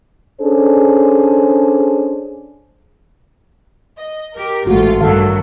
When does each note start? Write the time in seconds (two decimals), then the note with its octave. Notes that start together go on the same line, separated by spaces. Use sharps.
0.40 C#4 D4 G#4 A4 C5
3.98 D#5
4.34 G4 A#4
4.67 A1 G#2 A3 F4 F#4
5.01 G2 D#3 F#3 A4 F5